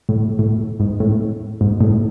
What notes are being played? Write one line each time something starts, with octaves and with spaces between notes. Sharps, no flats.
A2
A2
G#2
A2
G#2
A2